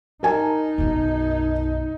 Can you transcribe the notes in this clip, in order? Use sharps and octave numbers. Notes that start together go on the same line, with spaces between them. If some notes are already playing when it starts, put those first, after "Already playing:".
D#4 A#4 G#5 A5
B1 F#2